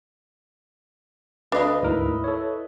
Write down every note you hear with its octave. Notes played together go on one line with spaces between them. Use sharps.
D2 D4 B4 D#5 F5
D2 G#2 E4 A#4
A4 C#5